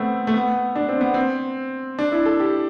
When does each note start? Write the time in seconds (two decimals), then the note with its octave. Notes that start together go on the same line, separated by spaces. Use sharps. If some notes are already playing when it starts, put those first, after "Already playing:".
Already playing: A3 B3 C4
0.27 A3
0.34 B3
0.76 D4
0.89 C4
1.01 B3
1.14 C4
1.99 D4
2.12 E4
2.25 A4
2.40 G4